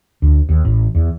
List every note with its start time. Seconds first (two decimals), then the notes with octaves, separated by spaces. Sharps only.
0.22 D2
0.49 D#2
0.65 A1
0.95 E2